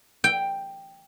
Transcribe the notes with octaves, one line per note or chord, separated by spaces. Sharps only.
G5